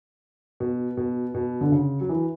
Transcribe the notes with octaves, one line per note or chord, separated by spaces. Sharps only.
B2
B2
B2
D3
C#3
F#3
E3